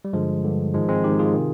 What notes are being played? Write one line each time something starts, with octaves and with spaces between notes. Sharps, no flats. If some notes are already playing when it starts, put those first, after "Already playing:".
G3
G2 D3 F3 G#3
G2 D3
G#2 D#3 F3 G#3
G#3 C4
G#2 D#3 D#4 G4
F4 G#4
C3 D#3